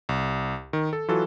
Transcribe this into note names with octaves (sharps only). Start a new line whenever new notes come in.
C2
D#3
A4
E3 F#3 F4 F#4 A4